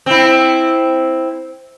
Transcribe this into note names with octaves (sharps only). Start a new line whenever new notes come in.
C4 E4